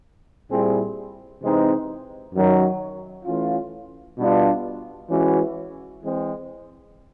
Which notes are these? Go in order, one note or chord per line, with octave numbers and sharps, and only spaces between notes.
A#2 G3 C4 E4 G#4
C3 E3 G#3 C4 D#4
F#2 D#3 F#3
E3 A3 C#4 F4
B2 G3 B3 D4 F4
E3 G#3 C#4 F#4
E3 G#3 C4